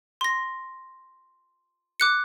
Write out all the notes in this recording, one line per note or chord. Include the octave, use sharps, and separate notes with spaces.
C6 A#6
D6 F#6 C#7